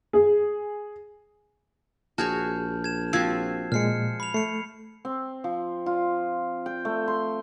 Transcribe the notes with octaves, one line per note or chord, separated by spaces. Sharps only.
G#4
A#1 F#4 G#4 C#5 A5 F6 G6
G#6 E7
F3 C4 F#4 E6 G#6 C7
A#2 G#3 F6 C7 C#7
B5 F7
A3 C7 C#7
C4
F3
F4
G5
A3
C6